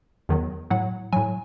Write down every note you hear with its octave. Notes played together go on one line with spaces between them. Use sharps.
E2 D#3 F#3
A2 F#3 F#5
A2 F#3 G#5